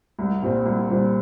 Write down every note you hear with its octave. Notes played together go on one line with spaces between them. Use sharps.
C2
A#2 G3 C4
C2
A#2 G3 C4